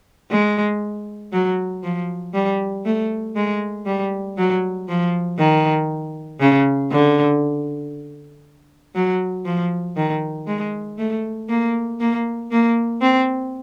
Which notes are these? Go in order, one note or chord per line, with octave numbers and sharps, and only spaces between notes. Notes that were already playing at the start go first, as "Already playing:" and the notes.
G#3
F#3
F3
G3
A3
G#3
G3
F#3
F3
D#3
C#3
D3
F#3
F3
D#3
G#3
A3
A#3
A#3
A#3
C4